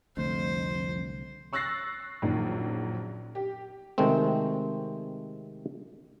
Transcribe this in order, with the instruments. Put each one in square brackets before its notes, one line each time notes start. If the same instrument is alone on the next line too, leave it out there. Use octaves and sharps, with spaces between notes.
[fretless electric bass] C2 D3 A3 [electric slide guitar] F2 [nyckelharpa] C5
[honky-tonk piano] C#6 E6 F#6 A6 A#6 C7
A#1 F#2 D#3
G4
[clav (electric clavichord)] C3 D#3 G#3 A3 C4